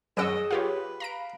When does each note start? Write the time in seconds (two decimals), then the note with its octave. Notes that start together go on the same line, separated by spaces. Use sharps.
0.17 F#2 C#4 G#4 D#5 F#5 C#6 E6 D7
0.51 F4 G4 B4 C#5
1.00 F5 A#5 B5 D7